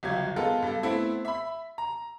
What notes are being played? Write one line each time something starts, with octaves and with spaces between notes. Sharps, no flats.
G1 C#2 F#3 G#6
G#3 B3 F4 A4 A#4
G2 A4
A3 B3 C4 E4
E5 B5
A#5